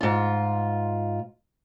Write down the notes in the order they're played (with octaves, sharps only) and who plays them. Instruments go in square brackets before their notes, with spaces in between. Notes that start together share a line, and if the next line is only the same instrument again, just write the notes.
[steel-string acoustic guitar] G#2 F4